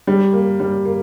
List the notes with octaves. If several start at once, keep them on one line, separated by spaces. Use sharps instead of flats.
G3
A#3
G3
A#3